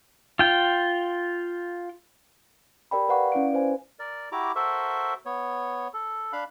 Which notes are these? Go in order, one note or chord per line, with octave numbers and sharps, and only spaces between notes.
F4 G5
G4 A#4 D5 G5 B5
B4 D5 F5 F#5 A#5 C#6
C#4 E4 D5 F5 D7
B4 C5 G#5
A#4 D5
E4 F#4 G4 A#5 D6
F#4 A4 A#4 C5 E5
B3 C#5
A4
D4 F5 B5 F#6